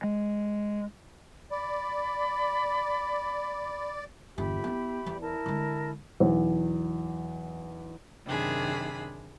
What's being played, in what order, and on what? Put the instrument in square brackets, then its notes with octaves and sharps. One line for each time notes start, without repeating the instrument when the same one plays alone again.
[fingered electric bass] G#3
[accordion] D5 [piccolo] B5
[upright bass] G1 E2 [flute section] G4 E5 B5
[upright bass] B3 E4
E2
[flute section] E4 A#4 A5
[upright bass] D3 G#3
[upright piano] B1 E2
[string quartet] F#2 C3 D#3 D4 G#4 B5